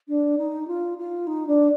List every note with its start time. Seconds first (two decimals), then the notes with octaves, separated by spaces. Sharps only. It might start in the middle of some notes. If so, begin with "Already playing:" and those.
0.08 D4
0.38 D#4
0.68 F4
0.98 F4
1.27 D#4
1.47 D4